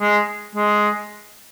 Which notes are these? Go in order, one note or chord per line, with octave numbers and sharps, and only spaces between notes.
G#3
G#3